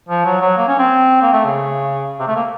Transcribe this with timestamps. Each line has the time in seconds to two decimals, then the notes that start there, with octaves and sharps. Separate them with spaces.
0.09 F3
0.26 F#3
0.41 F#3
0.57 A#3
0.68 C#4
0.79 C4
1.22 A#3
1.33 A3
1.44 C#3
2.20 C3
2.27 A3
2.36 A#3